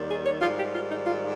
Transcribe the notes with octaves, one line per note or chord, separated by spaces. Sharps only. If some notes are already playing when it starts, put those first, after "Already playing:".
Already playing: D#2 D#3 G3
G#4
C#5
G#2 D#3 G3 F4
G4
F4
D#4
F4